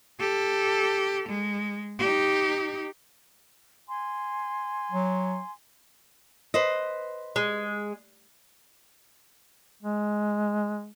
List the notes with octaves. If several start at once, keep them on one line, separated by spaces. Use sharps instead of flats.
G4 A4
G#3
D#4 G4
G#5 C6
F#3
B4 C5 D#5
G#3
G#3